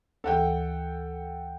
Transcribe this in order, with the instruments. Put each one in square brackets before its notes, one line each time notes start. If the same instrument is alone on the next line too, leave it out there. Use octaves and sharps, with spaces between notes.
[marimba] D2 E3 [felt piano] A4 F#5 G5